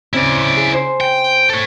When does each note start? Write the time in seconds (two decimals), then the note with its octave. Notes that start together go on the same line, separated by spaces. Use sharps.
0.13 C#3 C4 E4 D5
0.57 G#4
0.73 C5
1.01 G5
1.50 A4 C#5